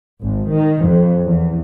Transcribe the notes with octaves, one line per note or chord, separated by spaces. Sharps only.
G#1
D#3
F2
E2